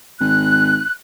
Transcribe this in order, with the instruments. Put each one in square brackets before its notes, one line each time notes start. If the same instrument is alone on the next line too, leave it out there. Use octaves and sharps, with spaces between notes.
[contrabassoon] G#1 [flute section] F#6